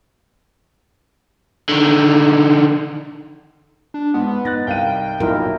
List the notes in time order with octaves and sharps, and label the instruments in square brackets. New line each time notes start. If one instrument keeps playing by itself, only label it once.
[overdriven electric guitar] D3 D#3
[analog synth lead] D4
[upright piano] G#2 [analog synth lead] B3
[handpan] D#4 [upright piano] F#6 A6 A#6
[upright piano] C2 F5 D#7 [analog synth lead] G5
[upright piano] B1 F#2 A#2 [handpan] D#4 E4 A#4